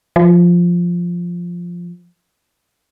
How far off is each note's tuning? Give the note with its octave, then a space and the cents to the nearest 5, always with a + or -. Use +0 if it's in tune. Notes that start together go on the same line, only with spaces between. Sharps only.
F3 +0